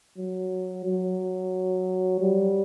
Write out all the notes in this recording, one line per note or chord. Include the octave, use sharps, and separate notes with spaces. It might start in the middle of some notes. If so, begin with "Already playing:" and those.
F#3
F#3
G3